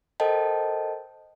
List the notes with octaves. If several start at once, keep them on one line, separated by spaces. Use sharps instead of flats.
A4 A#4 C5 D#5 G5 A5